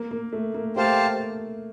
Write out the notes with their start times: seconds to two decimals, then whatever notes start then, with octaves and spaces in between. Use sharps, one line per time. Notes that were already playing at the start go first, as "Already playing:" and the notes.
Already playing: A#3
0.11 A#3
0.33 A3
0.54 A#3
0.76 A3 G4 C5 F5 A5